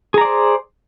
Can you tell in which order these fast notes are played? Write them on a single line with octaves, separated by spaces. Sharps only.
G#4 A#5 D5 C5